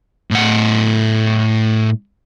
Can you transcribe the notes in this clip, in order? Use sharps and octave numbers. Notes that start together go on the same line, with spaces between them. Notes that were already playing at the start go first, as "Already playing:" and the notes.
A2 F#5